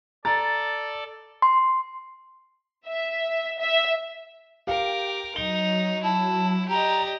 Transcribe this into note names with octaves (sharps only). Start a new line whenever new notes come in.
A4 D5 A#5 A6
C6
E5
E5
G4 A#4 F5 G5 D6
F#3 D#4 G7
E4 A5
G4 D5 D#5 A#5